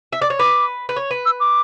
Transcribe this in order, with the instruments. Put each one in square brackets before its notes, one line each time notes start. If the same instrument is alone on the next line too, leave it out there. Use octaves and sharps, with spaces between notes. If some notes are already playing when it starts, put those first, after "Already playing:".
[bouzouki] E5
D5
C#5
[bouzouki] B4 [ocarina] D6
[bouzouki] B4
C#5
B4
[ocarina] E6
D6